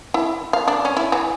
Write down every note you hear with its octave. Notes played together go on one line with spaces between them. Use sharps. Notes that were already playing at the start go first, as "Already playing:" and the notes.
E4
F5
D4
C#4
E4
E3